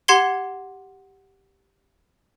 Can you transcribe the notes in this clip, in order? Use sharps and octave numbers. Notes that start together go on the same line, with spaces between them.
G4 F#5 C6 G#6 C7 G7